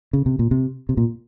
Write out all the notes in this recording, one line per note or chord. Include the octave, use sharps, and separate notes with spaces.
C#3
C3
A#2
C3
C3
A#2